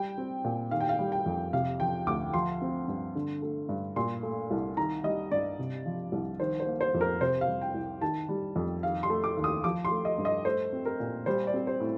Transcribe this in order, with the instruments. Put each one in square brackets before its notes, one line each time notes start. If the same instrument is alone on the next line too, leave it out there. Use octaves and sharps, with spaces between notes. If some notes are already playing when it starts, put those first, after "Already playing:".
Already playing: [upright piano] G3 G5
C4
A#2
D#3 F5
G5
F5
G3
G5
F2
C3 F5
F3 G5
D2 D6
F3 C6
C4
G2
D3
A3
G2
A#2 C6
A3
C2
D#3 A#5
G3 D#5
G2 D5
C3
F3
C2
D#3 C5
C5
A#3
C5
F2
A#4
C3 C5
F5
G3
G5
C2
D#3 A5
G3
F2
D#3 F5
C6
A3
D6
D#2
D#6
F3 D6
C6
A3
D#5
G2
D#5
A3 C5
C4
A#4
A#2
G3 C5
D5
C4
C5
A2